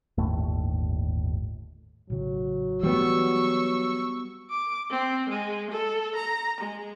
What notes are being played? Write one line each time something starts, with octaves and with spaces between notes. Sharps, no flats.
G1 D#2 A2 A3
A1 C#3 F#3
E3 G3 A3 B3 C#6 E6
D6
C4
G#3
A4
A#5
G#3